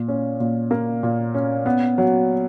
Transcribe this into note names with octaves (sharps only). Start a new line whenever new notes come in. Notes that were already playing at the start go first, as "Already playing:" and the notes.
Already playing: A#2
C#4
A#2
A#3
A#2
C#4
B3
F#3